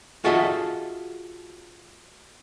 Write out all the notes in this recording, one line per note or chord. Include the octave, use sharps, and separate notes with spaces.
F4 F#4 G#4 A4 D#5 E5